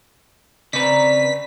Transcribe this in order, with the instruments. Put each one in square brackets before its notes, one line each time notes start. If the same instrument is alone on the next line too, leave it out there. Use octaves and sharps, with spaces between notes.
[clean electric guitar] C#3 C4 B4 [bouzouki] D5 A#5 [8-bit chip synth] B6